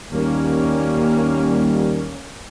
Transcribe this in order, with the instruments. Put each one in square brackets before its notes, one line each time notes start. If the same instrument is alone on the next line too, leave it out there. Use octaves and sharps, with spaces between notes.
[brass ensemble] D#2 D#3 G3 [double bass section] A#3 C#4